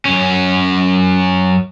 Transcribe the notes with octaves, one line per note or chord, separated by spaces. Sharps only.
F#2 C#4